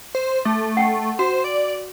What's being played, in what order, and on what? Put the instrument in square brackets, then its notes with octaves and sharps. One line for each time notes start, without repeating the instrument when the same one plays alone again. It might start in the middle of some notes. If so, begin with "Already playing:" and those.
[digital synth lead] C5
[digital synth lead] A3 [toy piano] A4
[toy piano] F#5 G5
[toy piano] F#4 [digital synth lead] C5
[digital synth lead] D5